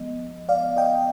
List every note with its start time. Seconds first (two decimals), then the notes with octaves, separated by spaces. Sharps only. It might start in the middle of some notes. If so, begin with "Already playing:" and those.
Already playing: F3 G#3 B3 D#5
0.49 D5 F5
0.76 D#5 G5